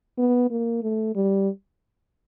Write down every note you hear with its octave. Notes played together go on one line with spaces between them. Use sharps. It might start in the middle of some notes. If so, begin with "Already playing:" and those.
B3
A#3
A3
G3